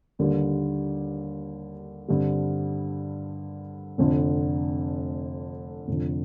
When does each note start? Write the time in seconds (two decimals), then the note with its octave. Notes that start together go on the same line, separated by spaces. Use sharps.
0.19 D#2 D3 G3
2.08 G2 D3 G3 C4
3.98 F1 F2 D3
5.88 F1 F2 D3